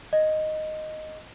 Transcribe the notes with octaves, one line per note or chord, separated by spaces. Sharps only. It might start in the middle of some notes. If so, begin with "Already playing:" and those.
D#5